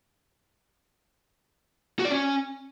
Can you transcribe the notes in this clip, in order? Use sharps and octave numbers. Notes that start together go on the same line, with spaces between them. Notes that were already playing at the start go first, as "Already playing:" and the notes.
F#4
D5
C#4